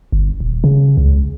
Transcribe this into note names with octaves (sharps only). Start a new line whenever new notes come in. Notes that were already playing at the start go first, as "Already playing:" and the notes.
G1
D#1
C#3
C#2